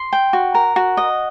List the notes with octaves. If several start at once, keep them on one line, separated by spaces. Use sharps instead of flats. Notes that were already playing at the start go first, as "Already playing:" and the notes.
Already playing: C6
G5
F#4
A#4
F#4
D#5